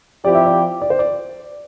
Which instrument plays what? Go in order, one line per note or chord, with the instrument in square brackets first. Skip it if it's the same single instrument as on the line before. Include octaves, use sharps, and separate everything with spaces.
[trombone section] F3 C4 E4 G4 [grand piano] D5
[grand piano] E5
D5
D5
C5
D5